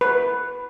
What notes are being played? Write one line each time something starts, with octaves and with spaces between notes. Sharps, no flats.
B4